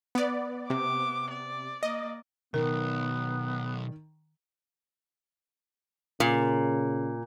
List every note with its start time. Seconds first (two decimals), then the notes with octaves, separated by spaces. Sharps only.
0.15 B3 D5
0.70 C3 B3 D6
1.31 D5
1.83 A#3 D5 D#5
2.54 B1 D#3 B3 A#4
6.20 A#2 C#3